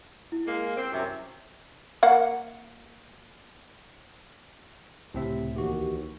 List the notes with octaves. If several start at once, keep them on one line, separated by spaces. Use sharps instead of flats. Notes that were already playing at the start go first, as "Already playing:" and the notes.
E4
G#3 A#3
C4
F#2 C3
A#3 F5 F#5
C#2 A2 C3 C4 E5
D#2 E3 F#4 G4